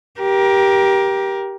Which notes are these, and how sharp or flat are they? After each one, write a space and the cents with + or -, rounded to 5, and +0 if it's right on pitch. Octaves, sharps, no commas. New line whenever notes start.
G4 -5 A#4 +25